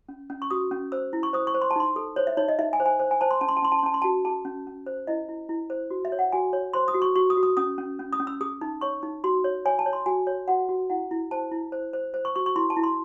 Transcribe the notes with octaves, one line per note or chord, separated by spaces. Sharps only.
C#4
C#4
C#6
F#4 D#6
C#4
C5 E6
E4
C#6
C5 D#6
C#6
C5
C6
A5
D#4 C6
A4
C5 C#5
E5
D#4 C#5
D#5
D#4 E5
G#5
C5
G#5
C5
G#5
C5 A5
C6
C#4 A5
C6
A5
C#4 C6
A5
C6
C#4 A5
C6
F#4 A5
G#4 A5
C#4
C#4
C5
E4 D#5
E4
E4
C5
F#4
E5
C#5
F#5
F#4 G#5
C#5
C5 C6
D#6
F#4
C#6
F#4 C#6
D#6
F#4
D#6
C#4 D#6
C#4
C#4
D#6
C#4
E6
G#4 D#6
D#4
C#5 C#6
D#4
F#4 C6
C#5
C#5 G#5
A5
C#5
C6
F#4 G#5
C#5
F#4 F#5
F#4
E4 F#5
E4
C5 A5
E4
C5
C5
C5
C#6
F#4 C#6
C#6
E4 C6
A5
E4
C6